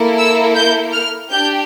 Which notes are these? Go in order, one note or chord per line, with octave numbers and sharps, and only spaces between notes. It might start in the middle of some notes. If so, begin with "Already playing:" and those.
Already playing: A#3 E4 A4
E6
G6
F6
D4 G4 G6